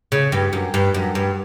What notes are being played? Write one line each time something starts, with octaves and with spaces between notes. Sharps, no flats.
C#3
G2
F#2
G2
F#2
G2